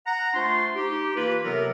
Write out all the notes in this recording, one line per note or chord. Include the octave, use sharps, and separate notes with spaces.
F#5 A#5
A3 D4 F4 C5 C6
D#4 G4
E3 A#3 F4 B4
C3 F#3 B3 G4 A4 A#4